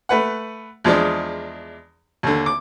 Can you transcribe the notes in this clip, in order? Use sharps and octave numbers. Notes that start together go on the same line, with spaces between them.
A3 B4 F#5
E2 F3 G#3 D4
D#2 D3
D6